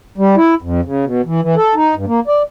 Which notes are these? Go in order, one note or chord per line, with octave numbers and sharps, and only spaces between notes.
G3
E4
F2
C#3
B2
E3
E3
A4
D#4
G2
A#3
D5